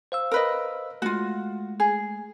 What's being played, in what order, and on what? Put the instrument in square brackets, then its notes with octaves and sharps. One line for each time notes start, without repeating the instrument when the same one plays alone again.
[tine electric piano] C5 F5 E6
[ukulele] A#4 B4 D#5
[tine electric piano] G#3 A3 [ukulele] F4 F#4
[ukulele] G#4